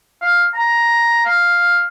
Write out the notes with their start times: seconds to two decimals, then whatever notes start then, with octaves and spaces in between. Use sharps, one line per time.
0.22 F5
0.54 A#5
1.26 F5